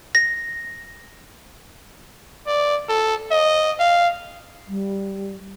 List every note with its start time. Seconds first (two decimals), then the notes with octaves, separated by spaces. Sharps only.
0.15 A#6
2.47 D5
2.89 A4
3.31 D#5
3.80 F5
4.68 G3